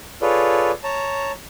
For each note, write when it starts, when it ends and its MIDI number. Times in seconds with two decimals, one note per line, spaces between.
0.22 0.71 65
0.22 0.71 68
0.22 0.71 69
0.22 0.71 71
0.22 0.71 73
0.22 0.71 74
0.84 1.32 73
0.84 1.32 81
0.84 1.32 82